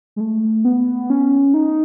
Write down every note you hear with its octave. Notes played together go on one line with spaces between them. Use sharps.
G#3
A3
B3
C#4
D#4